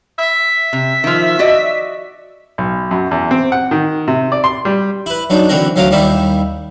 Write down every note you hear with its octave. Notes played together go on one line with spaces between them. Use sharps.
E5
C3
D#3 F3
F#4 D5 D#5
B1
F#2
E2
C4
F#5
D#3
C3
D5
C6
G3
E4 B4
F#3 D4 D#4
D3 E3 C4 F#4 A#4
D2 F#3 C#4 F4 A#5 D6
D#2 G3 A#3 D#4 E4 E5